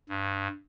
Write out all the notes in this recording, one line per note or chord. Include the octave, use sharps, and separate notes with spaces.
G2